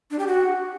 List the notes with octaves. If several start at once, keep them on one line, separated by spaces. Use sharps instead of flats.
D4
G4
F#4